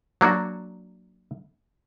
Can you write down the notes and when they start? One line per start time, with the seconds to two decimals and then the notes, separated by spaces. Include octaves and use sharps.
0.21 F#3 A#3 D4 F#4